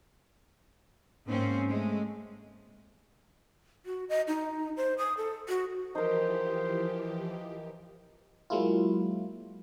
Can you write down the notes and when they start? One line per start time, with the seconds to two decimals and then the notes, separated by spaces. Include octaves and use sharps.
1.27 G#2 A#3 C4 C#4
1.68 G#3 A3
3.86 F#4
4.09 D#5
4.28 D#4
4.77 C5
4.98 D#6
5.17 A4
5.48 F#4
5.95 E3 F3 D#4 G4 A#4 C5
8.50 F#3 G#3 A#3 E4 F4